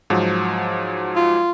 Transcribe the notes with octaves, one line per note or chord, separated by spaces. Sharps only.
G#2 F3 F#3
F4